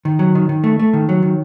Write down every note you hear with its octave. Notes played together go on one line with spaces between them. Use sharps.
D#3
F#3
D#3
D#3
A3
A3
D#3
F#3
D#3